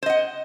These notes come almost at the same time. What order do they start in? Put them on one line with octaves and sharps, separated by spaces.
C5 D#5 F#5